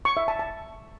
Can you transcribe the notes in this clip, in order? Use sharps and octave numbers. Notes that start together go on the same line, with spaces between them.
C#6
E5
A5
A5